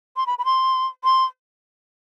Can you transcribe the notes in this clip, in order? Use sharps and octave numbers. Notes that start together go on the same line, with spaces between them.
C6
B5
B5
C6
C6